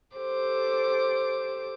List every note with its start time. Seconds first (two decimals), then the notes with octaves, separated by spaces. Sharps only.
0.15 G4 A4 C5 D6